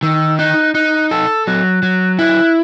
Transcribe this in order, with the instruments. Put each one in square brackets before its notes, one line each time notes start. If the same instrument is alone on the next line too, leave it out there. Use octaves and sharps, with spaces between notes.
[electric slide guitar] D#3 [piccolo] E6
[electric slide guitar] D#4 [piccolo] F#6
[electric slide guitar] D#4 [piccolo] F#6
[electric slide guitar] A4 [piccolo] E6
[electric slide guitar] F#3 [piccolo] F#6
[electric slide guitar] F#3
[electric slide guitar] E4 [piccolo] F#6